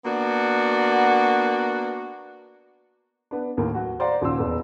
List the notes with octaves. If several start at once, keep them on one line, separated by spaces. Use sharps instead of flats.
A#3 B3 D4 F#4
B3 D4
D#2 A2 A#3
F#3 F#4
C5 D5 F5 F#5 A#5
D#2 A#2 C#3 C6 E6
E1 B3